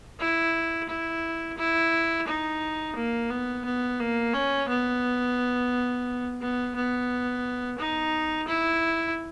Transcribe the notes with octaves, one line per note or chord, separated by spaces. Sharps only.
E4
E4
E4
D#4
A#3
B3
B3
A#3
C#4
B3
B3
B3
D#4
E4